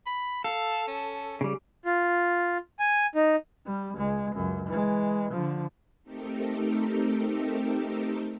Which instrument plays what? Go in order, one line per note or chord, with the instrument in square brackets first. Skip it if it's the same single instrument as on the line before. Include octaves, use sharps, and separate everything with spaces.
[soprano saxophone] B5
[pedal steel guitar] A4 [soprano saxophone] F5
[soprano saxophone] C#4
[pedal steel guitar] C#3 G3
[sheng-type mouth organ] F4
G#5
D#4
[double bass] G3
C#2 G#3
C#2 F#2
E3 G#3
D3 F3
[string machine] A3 C4 D#4 G4 A4 A#4